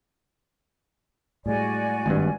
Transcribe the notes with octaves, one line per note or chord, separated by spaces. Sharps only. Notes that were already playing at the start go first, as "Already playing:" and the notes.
A2 G3 G#3 F#4 D5 G#5
G#1 G2